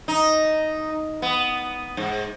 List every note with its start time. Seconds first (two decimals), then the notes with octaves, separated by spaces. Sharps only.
0.08 D#4
1.22 B3
1.97 G#2